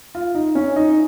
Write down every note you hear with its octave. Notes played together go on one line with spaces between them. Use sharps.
F4
D#4
C#4
D#4